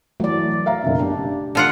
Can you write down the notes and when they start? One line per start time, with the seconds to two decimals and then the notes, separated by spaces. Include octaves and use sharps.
0.20 E3 F#3 A3 D5
0.66 E5 F5 A#5
0.83 F#1 B1
0.99 D4 G4
1.55 D3 F4 F#5